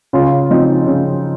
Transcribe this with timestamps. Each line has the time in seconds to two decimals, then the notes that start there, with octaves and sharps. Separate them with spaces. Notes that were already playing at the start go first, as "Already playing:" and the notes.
0.13 C#3 F4
0.50 F3 C4 D#4
0.87 C#3